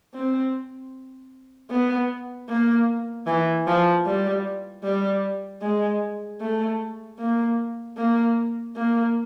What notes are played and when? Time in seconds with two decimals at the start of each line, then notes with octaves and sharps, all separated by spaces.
0.14 C4
1.70 B3
2.48 A#3
3.27 E3
3.67 F3
4.06 G3
4.84 G3
5.62 G#3
6.40 A3
7.19 A#3
7.97 A#3
8.76 A#3